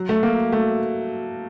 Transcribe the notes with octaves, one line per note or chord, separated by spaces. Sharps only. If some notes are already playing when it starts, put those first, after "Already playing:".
Already playing: F#3
A3
A#3
A3